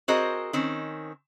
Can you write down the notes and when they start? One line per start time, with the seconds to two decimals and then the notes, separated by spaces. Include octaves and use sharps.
0.08 C4 F#4 G#4 A#4 C5 D#5
0.53 D#3 C4 C#4